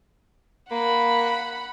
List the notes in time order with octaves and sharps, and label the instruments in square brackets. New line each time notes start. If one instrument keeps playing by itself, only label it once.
[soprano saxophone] A#3 [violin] F#5 B5